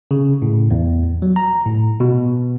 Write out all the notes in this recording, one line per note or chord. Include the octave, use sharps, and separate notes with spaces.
C#3
A2
E2
F#3
A#5
A2
B2